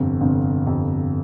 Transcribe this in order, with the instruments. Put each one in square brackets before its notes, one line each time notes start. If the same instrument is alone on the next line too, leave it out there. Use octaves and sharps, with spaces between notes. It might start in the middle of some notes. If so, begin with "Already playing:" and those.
Already playing: [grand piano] G1 F2 C3
G1 F2 C3
G1 F2 C3